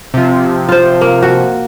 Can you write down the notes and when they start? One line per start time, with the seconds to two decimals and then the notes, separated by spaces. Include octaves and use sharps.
0.14 C3 F3
0.69 F4 C5
1.01 A#3
1.23 F#4